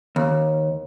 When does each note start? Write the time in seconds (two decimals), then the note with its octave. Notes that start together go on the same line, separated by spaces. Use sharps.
0.16 D#2